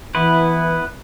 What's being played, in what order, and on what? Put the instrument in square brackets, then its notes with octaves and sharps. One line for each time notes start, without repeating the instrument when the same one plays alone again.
[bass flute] E3 [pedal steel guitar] B3 E4 B4